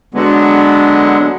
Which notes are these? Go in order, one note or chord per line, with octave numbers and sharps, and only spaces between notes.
D3 F#3 G#3 B3